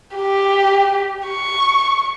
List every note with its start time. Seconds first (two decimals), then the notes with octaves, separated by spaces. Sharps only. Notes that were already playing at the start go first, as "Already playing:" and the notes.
0.16 G4
1.28 C#6